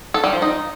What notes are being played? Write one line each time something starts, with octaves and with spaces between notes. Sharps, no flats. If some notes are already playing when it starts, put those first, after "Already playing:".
A4
G3
F3
D#4